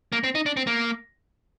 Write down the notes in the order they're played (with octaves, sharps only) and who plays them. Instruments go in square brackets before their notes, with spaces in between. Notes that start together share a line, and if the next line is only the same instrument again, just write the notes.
[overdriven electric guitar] A#3
C4
D#4
D4
C4
A#3